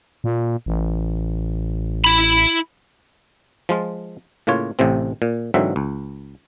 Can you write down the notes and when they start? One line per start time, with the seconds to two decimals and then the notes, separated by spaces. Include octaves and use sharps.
0.24 A#2
0.66 A1
2.04 E4 B5
3.69 F3 G#3 F4
4.47 A2 C#3 A#3 F4 C#5
4.79 A1 A2 C3 C4
5.22 A#2
5.54 G#2 D3 E3 F#3 C4 E5
5.76 C#2